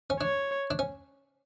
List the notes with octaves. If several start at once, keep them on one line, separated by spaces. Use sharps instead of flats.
C#4
D4 C#5
D4
C#4